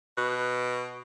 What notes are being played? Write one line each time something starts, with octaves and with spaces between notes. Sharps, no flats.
B2